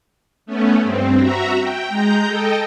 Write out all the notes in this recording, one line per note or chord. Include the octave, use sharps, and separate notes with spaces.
A3 B3 C#4
G2 C4
F#4 E5 A#5
G5
G#3 A#5 G6
A4 D#5 G5